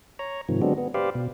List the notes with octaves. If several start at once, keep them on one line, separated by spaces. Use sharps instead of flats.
C#5 A#5
G#2 C3 D#3 F3
D3 F#3 G#3 B3 C4 D4
B3
G4 B4 C5 D5 F5
B2